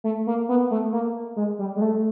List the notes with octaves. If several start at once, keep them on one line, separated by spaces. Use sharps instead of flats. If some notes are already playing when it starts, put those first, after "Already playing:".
A3
A#3
B3
A3
A#3
G#3
G3
G#3
A3